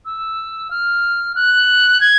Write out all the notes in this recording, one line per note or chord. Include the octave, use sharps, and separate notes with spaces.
E6
F6
F#6
G#6